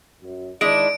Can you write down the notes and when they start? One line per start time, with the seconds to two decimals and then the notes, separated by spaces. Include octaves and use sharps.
0.22 F#2
0.61 D#3 E3 G#3 D4 E4 D5 D7